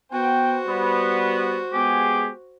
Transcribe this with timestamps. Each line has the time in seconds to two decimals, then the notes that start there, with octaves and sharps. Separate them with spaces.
0.12 B3 F#4 C5 G5
0.67 G3 B3
1.73 G#3 B3 G4 G#4